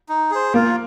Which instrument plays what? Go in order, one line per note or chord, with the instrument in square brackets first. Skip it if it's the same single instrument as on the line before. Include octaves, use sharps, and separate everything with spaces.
[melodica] D#4
G#4 C5
[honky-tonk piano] A#3 [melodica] F4